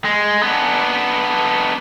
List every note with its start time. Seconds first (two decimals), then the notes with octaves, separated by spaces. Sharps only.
0.05 G#3
0.43 B3 D4